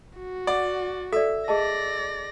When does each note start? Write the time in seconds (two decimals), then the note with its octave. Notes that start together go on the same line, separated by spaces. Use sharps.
0.18 F#4
0.47 D5 F#5
1.12 A4 D5 E5
1.48 G#4 D5 D#5 A5 A#6